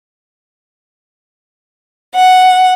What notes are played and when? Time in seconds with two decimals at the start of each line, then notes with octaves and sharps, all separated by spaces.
2.16 F#5